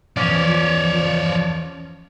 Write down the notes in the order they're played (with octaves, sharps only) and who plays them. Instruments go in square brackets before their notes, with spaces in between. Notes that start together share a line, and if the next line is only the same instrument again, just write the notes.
[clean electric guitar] E2 C#4 [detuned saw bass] F3 [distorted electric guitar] C#5 D5